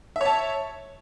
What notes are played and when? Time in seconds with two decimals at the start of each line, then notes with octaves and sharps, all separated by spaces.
0.16 E5
0.21 C#5
0.26 A5